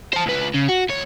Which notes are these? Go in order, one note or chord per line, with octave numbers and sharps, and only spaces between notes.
C5 A5
C#2 B4
C#3
F#4
D2 C#5